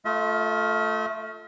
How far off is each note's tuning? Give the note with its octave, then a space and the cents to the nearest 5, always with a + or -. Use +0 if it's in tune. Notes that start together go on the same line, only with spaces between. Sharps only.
A3 +0 F4 +0 E5 -45